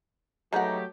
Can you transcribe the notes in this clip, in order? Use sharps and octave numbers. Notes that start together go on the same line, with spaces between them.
B2 F#3 G#3 A3 D#4 G4 F#5